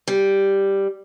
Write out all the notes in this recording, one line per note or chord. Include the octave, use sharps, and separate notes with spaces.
G3